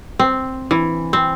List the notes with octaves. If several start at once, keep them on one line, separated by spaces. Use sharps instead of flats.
C4
E3
C4